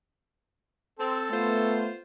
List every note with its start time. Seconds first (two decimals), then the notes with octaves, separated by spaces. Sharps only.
0.99 C4 A4
1.31 A3 B3 F4 C5